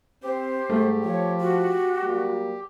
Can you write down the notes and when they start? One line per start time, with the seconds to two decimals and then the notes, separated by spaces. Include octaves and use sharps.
0.23 C4 G4 C5
0.70 G#2 G3 A3
1.05 F3 C#5
1.40 F#4
2.01 F#3 G3 A#3